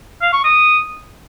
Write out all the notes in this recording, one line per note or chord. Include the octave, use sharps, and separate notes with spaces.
F5
C#6
D#6